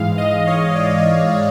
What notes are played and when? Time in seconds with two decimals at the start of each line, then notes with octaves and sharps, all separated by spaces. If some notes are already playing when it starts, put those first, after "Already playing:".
Already playing: G#2 E3 G#3 F5
0.18 D#5
0.47 C#5
0.76 D5
1.04 D#5
1.32 F5